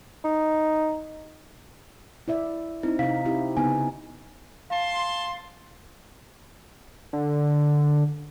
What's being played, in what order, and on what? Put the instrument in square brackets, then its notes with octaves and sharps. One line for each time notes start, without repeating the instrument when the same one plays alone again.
[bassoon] D#4
[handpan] E4 D5 E5
[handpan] C4 [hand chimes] D#4 E4
[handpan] C3 D#4 [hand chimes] F5 B6
[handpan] C4 E4 G4
[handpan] C#3 B3 D#4 [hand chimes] G#5
[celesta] F5 [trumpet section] A5 C6
[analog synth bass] D3